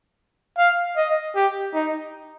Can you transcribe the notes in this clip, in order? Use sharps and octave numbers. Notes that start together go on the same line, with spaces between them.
F5
D#5
G4
D#4